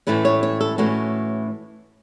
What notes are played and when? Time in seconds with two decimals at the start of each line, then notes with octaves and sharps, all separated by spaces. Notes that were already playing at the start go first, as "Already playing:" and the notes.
0.07 A2 E3 A3 C#4 B4
0.25 C#5
0.43 C#5
0.61 A4
0.78 A2 E3 A3 C#4 F#4